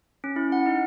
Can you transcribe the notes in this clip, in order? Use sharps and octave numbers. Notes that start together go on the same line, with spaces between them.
C#4
E4
F#5
D#4